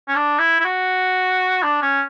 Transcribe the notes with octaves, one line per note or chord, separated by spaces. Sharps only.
C#4
D4
E4
E4
F#4
D4
C#4